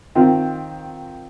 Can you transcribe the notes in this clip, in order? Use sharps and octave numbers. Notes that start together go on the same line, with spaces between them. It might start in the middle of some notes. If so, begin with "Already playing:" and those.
D#3 C4 F4